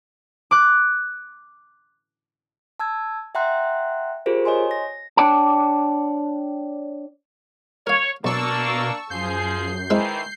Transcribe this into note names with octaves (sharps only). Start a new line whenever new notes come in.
D6 F#6
A5 E6 G#6
E5 F#5 G5 A#5 C6 F#6
F4 G4 G#4 A#4 C5
C#5 D#5 G#5 C6
A#6
D4 C#5 D5 G5 A5
A#4 C#5 F5
B1 B2 A#3 D4 D5 A5 C#6 E6
F#2 F3 G#4 G6 C7
D#3 E3 G#3 C4 E4